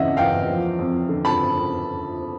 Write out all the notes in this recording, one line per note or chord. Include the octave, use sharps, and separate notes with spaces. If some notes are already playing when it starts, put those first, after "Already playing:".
Already playing: E2 C#3 E3 D#5 E5 F#5
E2 F5 G5
F3
F2
D3
A5 B5